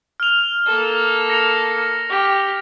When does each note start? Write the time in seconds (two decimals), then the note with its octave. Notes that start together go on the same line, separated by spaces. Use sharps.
0.20 F6 F7
0.67 A#3 A4
1.30 A#6 C#7 F7
2.09 G4